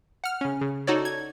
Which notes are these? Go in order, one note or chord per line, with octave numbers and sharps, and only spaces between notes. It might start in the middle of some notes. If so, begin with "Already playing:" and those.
F#5 F6
C#3 C#4
C#3
D#4 F#4 A4 C#5 D5
G#6